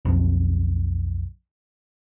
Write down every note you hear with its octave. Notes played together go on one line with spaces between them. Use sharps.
B1 F2